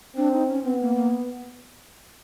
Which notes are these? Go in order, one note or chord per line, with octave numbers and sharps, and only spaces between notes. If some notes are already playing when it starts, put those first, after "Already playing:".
C4 D4
D#4
C#4
B3 C4
A#3
A#3